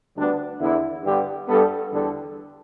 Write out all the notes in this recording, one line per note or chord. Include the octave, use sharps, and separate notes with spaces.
D2 D3 G3 B3 D4
E2 D3 B3 E4
G2 D3 G3 B3 G4
G2 G3 B3 A4
E2 D3 G3 A4